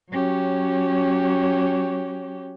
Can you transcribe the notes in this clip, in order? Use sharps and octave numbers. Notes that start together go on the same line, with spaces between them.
F#3 C#4 F#4 G4 C#5